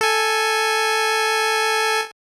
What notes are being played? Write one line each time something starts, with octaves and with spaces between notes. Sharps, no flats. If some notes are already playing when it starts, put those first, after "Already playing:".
A4 G#5